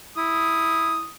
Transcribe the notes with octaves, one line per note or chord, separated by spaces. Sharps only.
E4 D#6